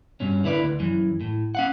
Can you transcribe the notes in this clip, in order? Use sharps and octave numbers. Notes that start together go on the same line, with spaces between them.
G2 B2 C#4
D3 E4 B4 D5
D2
F#2 E3
A2
C#4 F5 F#5